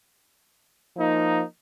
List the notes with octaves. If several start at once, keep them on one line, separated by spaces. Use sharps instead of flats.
F3 A#3 D#4